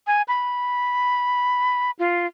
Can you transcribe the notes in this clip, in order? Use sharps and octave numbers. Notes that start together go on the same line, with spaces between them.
G#5
B5
F4